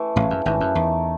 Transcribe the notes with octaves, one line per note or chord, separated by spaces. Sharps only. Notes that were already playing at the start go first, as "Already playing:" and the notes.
Already playing: E3 A3
A1 A2 C#3
F#2
G#1 G#2 E3 A3
F#2
E2 D#3